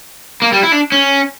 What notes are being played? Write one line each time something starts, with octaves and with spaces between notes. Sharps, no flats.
A#3
G3
E4
D4
C#4